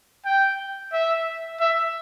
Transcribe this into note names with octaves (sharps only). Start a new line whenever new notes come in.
G5
E5
E5